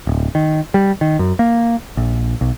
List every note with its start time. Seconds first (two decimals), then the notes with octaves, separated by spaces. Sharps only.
0.07 D1
0.35 D#3
0.74 G3
1.01 D#3
1.19 F#2
1.39 A#3
1.97 A#1
2.41 B1